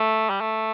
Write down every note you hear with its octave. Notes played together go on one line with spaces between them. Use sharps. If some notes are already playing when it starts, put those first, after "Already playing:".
Already playing: A3
G3
A3